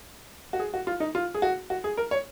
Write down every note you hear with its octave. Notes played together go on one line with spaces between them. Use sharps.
F#4
G#4
F#4
F4
D#4
F4
G#4
F#4
F#4
G#4
A#4
C#5